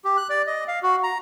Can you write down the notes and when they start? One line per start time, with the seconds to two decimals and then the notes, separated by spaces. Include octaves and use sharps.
0.05 G4
0.17 F#6
0.30 D5
0.47 D#5
0.68 F5
0.83 F#4
1.03 A#5